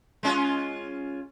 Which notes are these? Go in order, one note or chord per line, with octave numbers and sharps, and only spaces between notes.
G#3 C#4 F4